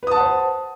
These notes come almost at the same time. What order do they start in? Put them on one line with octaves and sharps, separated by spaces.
B4 D#6 A5 F#5 C5